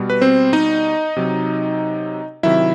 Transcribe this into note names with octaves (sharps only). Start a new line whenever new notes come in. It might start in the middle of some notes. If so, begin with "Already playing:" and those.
Already playing: B2 G3
B4
C4 C5
D#4 D#5
C3 F#3
C3 D#3 F#3 E4 E5